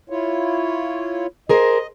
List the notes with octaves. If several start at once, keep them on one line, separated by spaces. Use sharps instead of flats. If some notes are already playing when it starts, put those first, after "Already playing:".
E4 F4 C#5
G#4 A#4 C5 D#5